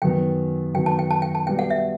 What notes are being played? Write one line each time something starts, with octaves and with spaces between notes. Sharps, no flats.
F#2 D#3 F#3 B3 G5
F#2 D#3 F#3 B3 G5
A5
G5
A5
G5
A5
B2 G3 B3 G5
F#5
E5